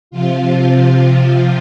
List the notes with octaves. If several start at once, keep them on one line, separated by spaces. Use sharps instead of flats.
C3 F3 F4